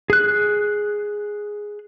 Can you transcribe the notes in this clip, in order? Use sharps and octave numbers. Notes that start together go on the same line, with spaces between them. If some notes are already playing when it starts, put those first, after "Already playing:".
G#4 F#6